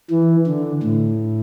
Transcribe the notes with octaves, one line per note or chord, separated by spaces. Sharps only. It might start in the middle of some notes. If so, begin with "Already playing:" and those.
E3
D3
A2